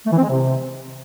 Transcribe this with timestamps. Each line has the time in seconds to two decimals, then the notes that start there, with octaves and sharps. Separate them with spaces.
0.06 A3
0.12 E3
0.17 C4
0.23 G#3
0.29 C3